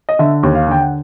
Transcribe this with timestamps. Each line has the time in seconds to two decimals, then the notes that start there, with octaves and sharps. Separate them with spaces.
0.09 D#5
0.19 D3 E5
0.43 D#2
0.55 F5
0.67 D3 G5
0.81 F#5